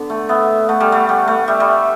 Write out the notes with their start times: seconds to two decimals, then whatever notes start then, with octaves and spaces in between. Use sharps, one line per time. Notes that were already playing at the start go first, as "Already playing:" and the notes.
Already playing: D3 B3
0.10 A3
0.29 B3 E5
0.68 A3 F#5
0.80 G3
0.92 A3
1.08 G3 F#5
1.28 A3
1.47 G3 E5
1.60 G3